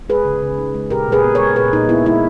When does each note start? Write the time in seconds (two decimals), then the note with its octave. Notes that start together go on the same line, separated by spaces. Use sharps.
0.09 G#3 G#4 B4
0.25 C#3
0.42 C#3
0.58 D#4
0.74 G#3
0.90 A#2 G4 A#4
1.08 A#2 G#4 B4
1.23 B3
1.35 A#4 C#5
1.40 G#3
1.56 A#2 G#4 B4
1.73 A#2 D#4
1.89 B3 E4
2.06 G#3 E4